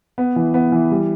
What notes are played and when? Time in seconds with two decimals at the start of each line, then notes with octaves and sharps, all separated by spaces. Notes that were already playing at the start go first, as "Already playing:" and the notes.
0.18 B3
0.36 E3
0.54 B3
0.72 E3
0.91 G3